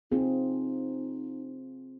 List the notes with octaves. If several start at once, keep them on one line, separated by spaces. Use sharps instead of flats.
C4 D#4 F4 G#4